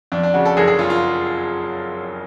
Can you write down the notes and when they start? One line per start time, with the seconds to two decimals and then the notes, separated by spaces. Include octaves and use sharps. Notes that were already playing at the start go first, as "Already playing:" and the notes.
0.12 F2 D4
0.23 D4
0.34 C#3 F#4
0.45 A4
0.57 F#1 G#4
0.67 G#4
0.79 F#1 F4
0.90 F4